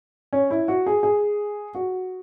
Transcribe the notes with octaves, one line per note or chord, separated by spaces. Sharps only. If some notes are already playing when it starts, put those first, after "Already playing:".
C#4
E4
F#4
G#4
G#4
F#4